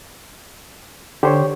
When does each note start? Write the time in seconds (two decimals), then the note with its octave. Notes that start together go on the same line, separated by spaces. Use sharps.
1.23 D3 G4 C5 C#5